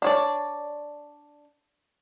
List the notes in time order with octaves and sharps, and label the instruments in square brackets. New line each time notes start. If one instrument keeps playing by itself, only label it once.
[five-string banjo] D4 C#5 D5